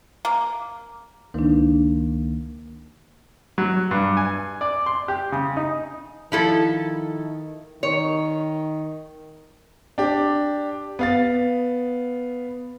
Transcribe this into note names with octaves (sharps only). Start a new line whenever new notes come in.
A#3
C#2 D#3 A#3 D4 D#4
F#3
G2
G#5
D5
C6
G4
C#3
D#4
D#3 F3 E4 A4
D#3 C#5
D4 G4
B3 F5 A6